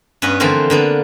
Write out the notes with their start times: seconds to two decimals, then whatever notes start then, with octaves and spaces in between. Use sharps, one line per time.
0.22 G2 B3 C#4 B4 D#5
0.40 D3 E3 F3 A3 C4 A#4
0.70 D3 A#3 B3